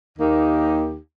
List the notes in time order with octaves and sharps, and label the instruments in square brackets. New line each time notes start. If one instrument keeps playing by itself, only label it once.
[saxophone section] D#2 D#3 A#3 D#4 G4